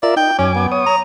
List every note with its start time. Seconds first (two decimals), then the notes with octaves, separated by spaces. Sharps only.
0.03 F4 A#4 D5 E5
0.16 D#4 G5
0.39 F#2 C#4 G#5 D6
0.55 B3
0.72 C#5 D#6
0.86 A#5